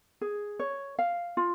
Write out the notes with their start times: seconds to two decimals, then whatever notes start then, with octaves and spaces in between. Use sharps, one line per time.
0.21 G#4
0.59 C#5
0.99 F5
1.37 F4